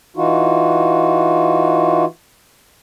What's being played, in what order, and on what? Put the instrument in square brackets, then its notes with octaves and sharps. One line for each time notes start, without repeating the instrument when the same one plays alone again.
[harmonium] E3 D#4 F4 F#4